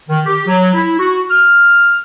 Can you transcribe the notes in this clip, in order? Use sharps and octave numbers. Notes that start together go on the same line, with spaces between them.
D#3
G4
F#3
E4
F#4
F6